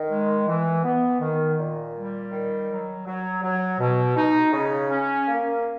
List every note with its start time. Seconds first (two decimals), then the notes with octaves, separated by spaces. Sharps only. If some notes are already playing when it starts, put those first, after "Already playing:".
Already playing: D#3
0.10 G#3
0.47 E3
0.84 B3
1.20 D#3
1.58 A#2
1.95 G3
2.31 D#3
2.69 F#3
3.06 F#3
3.42 F#3
3.79 B2
4.16 D#4
4.53 C#3
4.89 C#4
5.27 A#3